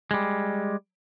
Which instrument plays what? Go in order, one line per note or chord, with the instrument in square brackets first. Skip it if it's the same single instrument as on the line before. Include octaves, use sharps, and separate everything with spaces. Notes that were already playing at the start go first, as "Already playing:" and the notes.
[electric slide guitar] G3 G#3